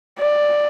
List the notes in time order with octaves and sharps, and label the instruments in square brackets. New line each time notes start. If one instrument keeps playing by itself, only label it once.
[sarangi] D5